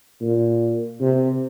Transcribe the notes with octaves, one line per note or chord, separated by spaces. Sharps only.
A#2
C3